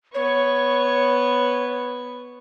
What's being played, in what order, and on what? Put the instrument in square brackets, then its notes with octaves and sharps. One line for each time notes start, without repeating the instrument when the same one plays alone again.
[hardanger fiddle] B3 C#6 [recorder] C#5